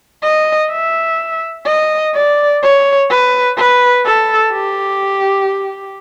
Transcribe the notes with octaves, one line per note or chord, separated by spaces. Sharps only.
D#5
E5
D#5
D5
C#5
B4
B4
A4
G4